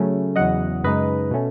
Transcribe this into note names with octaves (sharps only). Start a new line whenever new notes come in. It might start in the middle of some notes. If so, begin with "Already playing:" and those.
Already playing: C#3 F#3 A3 C#4
E2 C#3 F#3 D#5 F#5
F#2 C#3 G#3 D#4 B4 D#5
B2 A3 C#4